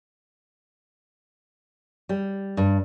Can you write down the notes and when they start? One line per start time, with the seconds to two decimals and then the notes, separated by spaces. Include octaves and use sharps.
2.09 G3
2.57 G2